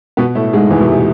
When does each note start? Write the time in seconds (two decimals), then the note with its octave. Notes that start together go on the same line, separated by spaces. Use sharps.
0.17 B2 B3
0.35 A2 A3
0.53 G#2 G#3
0.70 E2 E3
0.80 B2
0.88 C3